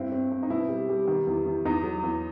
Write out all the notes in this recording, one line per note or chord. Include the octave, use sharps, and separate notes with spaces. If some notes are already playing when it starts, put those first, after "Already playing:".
Already playing: G2 C4 E4
C4
C4
D#4
B2 E4
G3
G3
D#3
E2
E2
E2 D#4
F#3
E2